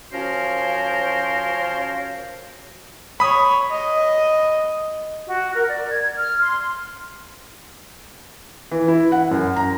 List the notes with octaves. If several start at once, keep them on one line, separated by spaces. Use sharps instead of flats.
F3 C#4 F#4 A#4 C5 C#5
C#5 B5 D#6
D#5
F#4
A#4
D5
G#6
F6
C6
E3
E4
F#5
F#2
A#5